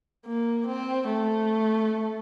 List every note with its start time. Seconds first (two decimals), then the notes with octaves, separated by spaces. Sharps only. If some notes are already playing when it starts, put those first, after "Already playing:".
0.26 A#3
0.67 C4
1.09 A3